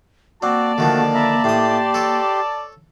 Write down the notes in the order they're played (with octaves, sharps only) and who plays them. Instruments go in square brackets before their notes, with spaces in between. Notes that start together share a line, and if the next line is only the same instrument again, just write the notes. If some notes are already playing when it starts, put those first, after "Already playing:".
[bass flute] A#3 [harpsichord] C4 [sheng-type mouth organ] F#4 [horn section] D5 A5
[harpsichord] D3 D#3 F3 [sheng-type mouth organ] A3 F#4
[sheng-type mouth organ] E5 A#5 B5
[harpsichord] A2 D#6 [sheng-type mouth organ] G4 C6
[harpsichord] A4 C#5